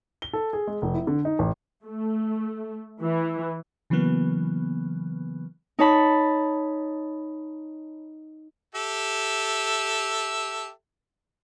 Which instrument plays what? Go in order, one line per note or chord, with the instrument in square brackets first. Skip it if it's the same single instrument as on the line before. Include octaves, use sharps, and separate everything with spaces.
[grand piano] G7
A4
G#4
G#3
F1
E4
D3
D#4
A1
[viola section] A3
E3
[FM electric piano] C#3 E3 F#3 A#3 B3
[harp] D#4 C#5 A5 B5
[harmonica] G4 A4 E5